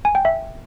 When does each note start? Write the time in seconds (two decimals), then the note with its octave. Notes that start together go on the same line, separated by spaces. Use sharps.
0.05 G#5
0.15 G5
0.25 E5